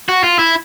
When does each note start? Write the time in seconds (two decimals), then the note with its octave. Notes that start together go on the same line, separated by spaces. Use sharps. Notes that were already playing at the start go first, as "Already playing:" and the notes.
0.09 F#4
0.24 F4
0.39 E4